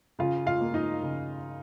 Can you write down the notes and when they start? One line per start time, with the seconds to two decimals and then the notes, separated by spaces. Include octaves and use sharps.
0.19 C#3 F4 F5
0.46 F4 F5
0.61 A#3
0.74 D#4 D#5
1.03 C#3